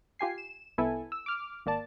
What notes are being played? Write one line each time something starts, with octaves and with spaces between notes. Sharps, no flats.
F4 G4 G#5 C7
E7
C2 B3 E4 A4 G#5
E6
D6 F6
G#1 A#3 D5 A5